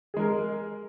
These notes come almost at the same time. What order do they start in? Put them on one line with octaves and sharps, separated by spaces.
G#4 G#3 A#4